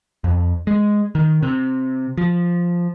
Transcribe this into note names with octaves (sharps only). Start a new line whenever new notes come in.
F2
G#3
D#3
C3
F3